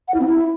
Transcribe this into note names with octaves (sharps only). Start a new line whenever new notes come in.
F#5
E4
C4
E4